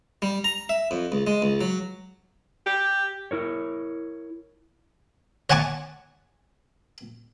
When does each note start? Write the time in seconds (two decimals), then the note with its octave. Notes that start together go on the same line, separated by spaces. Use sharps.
0.22 G3
0.44 A#5
0.69 E5
0.91 F2
1.12 C#2
1.27 G#3
1.42 C#2
1.61 F#3
2.66 G4
3.31 E4 A#4 C#5
5.50 C#5 F#5 G#5 A5 C#6 D6